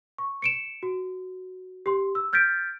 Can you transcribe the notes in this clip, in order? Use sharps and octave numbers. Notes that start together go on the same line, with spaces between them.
C#6
C#7 D7 E7
F#4
G4 C6
E6
F6 G6 A6 B6 D7